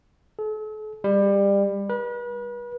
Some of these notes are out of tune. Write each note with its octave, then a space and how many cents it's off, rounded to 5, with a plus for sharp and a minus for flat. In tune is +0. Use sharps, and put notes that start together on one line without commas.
A4 -40
G3 +25
B4 -35